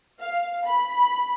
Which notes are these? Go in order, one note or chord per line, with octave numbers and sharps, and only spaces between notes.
F5
B5